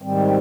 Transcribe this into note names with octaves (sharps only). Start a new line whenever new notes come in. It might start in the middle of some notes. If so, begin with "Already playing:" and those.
G#2 D#3 G3 C4